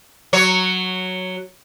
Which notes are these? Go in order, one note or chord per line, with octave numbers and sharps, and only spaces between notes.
F#3 C#5